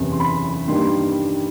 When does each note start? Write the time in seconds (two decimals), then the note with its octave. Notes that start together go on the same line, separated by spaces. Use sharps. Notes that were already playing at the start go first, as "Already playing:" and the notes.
Already playing: F#1 E2 C3
0.12 C6
0.20 B5
0.68 G2 D#3 G3 A#3 C6